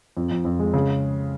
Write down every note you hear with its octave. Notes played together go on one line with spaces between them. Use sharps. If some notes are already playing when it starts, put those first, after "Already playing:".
F2
F2
F2
G#3
C#3